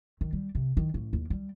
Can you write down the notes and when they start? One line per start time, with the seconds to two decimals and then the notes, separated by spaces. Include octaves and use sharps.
0.21 D#3
0.33 G3
0.55 C3
0.77 D#3
0.94 A1
1.13 D#2
1.30 G3